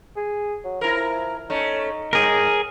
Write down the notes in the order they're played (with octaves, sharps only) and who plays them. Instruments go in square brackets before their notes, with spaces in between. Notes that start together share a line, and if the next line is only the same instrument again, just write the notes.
[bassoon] G#4
F#3
[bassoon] F3 [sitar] E4 A#4
[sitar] A3 C#4 [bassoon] D#4
[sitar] G2 [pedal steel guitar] G#4 A#4